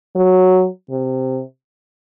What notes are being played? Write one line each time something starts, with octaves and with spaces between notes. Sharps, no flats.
F#3
C3